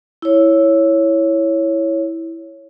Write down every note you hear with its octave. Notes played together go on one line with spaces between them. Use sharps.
E4 C#5